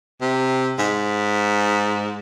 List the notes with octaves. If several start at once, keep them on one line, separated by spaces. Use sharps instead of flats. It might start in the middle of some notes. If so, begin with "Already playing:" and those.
C3
G#2